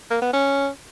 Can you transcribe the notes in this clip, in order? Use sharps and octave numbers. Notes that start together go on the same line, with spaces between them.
A#3
B3
C#4